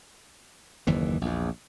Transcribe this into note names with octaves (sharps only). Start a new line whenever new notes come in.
F#1 D#2 E3
A#1 E2